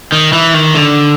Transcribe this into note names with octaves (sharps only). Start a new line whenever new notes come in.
D#3
E3
D#3
D3